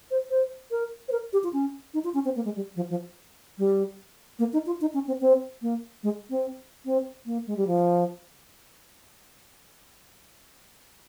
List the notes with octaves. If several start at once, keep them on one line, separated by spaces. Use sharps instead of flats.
C5
C5
A#4
C5
A#4
G4
F4
C#4
D#4
F4
C#4
C4
A#3
G#3
G3
F3
F3
G3
A#3
D#4
F4
D#4
C#4
C4
C4
A#3
G#3
C4
C4
A#3
G#3
G3
F3